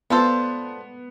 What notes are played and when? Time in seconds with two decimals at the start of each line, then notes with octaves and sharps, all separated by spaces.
0.10 B3 D4 F4 A4 C5